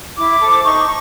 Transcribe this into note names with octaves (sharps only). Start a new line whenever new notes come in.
E4 D6
A4 C5
D#4 C#6